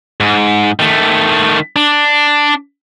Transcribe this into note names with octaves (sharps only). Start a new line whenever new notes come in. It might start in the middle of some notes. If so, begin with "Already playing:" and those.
G#2
D#3 A3
D4